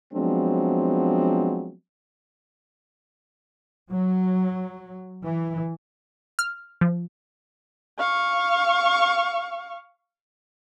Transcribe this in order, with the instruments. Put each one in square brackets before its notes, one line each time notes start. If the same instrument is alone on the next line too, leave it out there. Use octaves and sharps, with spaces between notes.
[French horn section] F3 F#3 G#3 B3 C4 D4
[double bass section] F#3
E3
[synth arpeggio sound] F6
F3
[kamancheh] F5 C#6